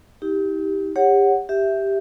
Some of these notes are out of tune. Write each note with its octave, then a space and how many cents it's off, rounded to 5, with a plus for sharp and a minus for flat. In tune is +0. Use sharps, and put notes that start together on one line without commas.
D#4 +45 G4 +0
G4 +30 C#5 -5 F#5 +0
G4 +0 E5 +0